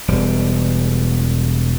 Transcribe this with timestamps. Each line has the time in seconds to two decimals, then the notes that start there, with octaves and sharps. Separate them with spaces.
0.08 E1 G3